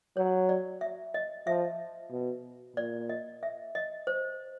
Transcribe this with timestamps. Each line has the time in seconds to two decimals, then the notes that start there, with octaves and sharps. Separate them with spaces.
0.17 F#3 C#5
0.49 D5
0.81 E5
1.14 D#5
1.47 F3 E5
2.11 B2
2.76 A#2 D5
3.09 D#5
3.43 E5
3.75 D#5
4.07 C5